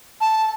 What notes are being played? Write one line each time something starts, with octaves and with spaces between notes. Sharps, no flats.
A5